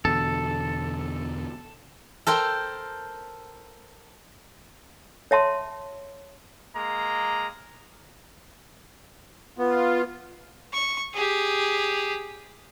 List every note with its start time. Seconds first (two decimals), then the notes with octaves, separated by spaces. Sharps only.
0.05 E2 B2 D3 A4
2.27 A4 A#4 C5 G5
5.31 C#5 E5 A5 C6
6.75 G#3 A#3 A#5
9.58 B3 F4
10.73 C#6
11.14 G4 G#4